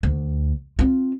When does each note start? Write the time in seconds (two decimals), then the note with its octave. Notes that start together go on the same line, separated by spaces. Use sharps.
0.03 D2
0.79 C4 F4